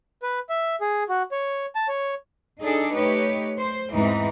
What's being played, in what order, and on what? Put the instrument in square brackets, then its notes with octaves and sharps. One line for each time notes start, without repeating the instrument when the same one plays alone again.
[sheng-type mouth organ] B4
E5
G#4
F#4
C#5
A5
C#5
[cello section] D4 D#4 G#4 A4 D5
A3 D#4 G4 B4 C#5
C5
E2 G#2 E3 G#3 C4 D#4